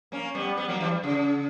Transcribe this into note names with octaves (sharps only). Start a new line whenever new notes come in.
A#3 C#4
G3 B3
G3 B3
F#3 A#3
E3 G3
C#3